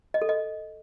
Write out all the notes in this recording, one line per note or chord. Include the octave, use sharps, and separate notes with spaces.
D#5
A4
D#5